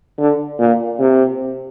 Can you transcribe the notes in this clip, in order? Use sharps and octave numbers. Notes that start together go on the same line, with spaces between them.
D3
A#2
C3